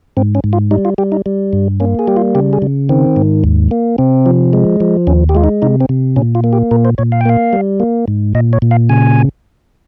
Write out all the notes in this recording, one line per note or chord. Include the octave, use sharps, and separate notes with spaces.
G#2 C4
C#4
G#2
F4
G3 D#4
F4
G3 G4
D#4
G3
G2
A#3 C#4
G#4
G3 G4
F4
C#3 G4
G#4
C#3
D#3 C4
G#2
D#2
A#3
C3 C4
F3
G#3
F3
D#2 C#4
G4
G#3 F4
D#4
C3 D#4
C4
C3
A#2 C#4
F4
A#3
G4
A#2 A#4
C5
A#2 C#5
F5
G5
A#3 F5
G3
A#3
G#2
A#2 D#5
C#5
A#2
F5
C#3 G#5